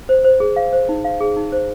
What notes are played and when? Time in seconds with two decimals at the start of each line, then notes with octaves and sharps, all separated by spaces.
0.09 C5
0.25 C5
0.40 G#4
0.56 F5
0.73 C5
0.89 D#4
1.05 F5
1.21 G#4
1.37 D#4
1.52 C5